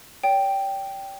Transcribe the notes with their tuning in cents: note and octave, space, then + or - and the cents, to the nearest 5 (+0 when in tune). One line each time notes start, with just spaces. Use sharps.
C#5 +40 G5 +0